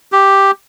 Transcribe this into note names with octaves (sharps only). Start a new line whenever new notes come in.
G4